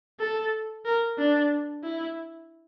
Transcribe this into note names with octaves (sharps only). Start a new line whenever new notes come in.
A4
A#4
D4
E4